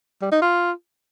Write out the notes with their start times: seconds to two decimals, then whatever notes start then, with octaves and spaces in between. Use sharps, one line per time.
0.22 G3
0.32 D#4
0.42 F4